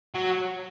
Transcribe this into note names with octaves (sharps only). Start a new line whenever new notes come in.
F#3